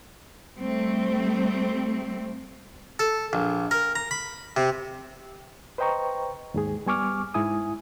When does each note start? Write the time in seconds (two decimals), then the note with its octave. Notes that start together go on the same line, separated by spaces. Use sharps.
0.57 G3 A3 C4
2.99 A4
3.33 A#1
3.71 A#4
3.95 A#5
4.11 B5
4.57 C3
5.78 B4 C5 D#5 G5 A#5 C#6
6.54 D#2 G#2 G#4
6.86 G3 B3 G#5 C#6 D6 F6
7.34 G#2 E4 G#5 D#6